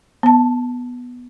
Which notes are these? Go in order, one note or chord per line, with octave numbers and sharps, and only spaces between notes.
B3 A5